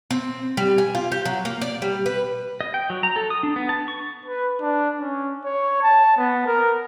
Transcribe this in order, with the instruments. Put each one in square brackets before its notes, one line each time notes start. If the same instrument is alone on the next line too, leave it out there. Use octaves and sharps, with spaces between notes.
[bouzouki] C4
G3
G#5
F4
G4
F#3
A#3
D5
G3
B4
[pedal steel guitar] D#5
G5
F#3
A#5
A4
D#6
D4
B3
A5
C#6
[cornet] B4
D4
C#4
C#5
A5
B3
A#4